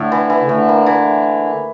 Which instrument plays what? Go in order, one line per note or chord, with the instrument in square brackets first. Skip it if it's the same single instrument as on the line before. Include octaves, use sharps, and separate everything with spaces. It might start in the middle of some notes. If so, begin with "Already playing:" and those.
Already playing: [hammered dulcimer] A2 [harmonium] D3
[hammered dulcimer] E3
E3
[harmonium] C#3
[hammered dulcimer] A2 [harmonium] D3
[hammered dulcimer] A#3
E3